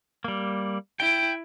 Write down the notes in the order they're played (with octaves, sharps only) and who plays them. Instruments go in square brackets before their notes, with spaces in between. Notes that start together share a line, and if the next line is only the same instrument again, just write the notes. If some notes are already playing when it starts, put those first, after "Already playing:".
[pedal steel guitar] G3 A#3
[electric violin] E4 D7 [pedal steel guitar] G5